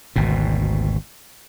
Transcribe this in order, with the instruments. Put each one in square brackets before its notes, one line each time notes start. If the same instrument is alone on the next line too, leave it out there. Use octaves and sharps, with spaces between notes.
[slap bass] G#1 D2 B2